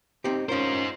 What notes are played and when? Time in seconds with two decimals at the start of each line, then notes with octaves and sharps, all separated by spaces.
0.24 C4 D#4 G4
0.49 C#4 D#4 F4 A#4 C5